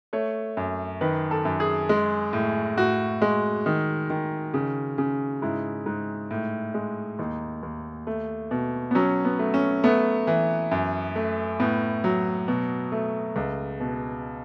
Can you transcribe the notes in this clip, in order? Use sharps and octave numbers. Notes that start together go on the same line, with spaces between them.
A3 C#5
F#2
D#3 B4
A4
F#2
G#4
G#3
A2
A2 F#4
G#3
D#3
D#3
C#3
C#3
G#2 E4
G#2
A2
G#3
D#2 D#4
D#2
A3
B2
B3
F#3 C#4
B3
A3
C#4
A3 B3
E3
F#2
A3
A2 B3
F#3
B2
A3
C#2
B2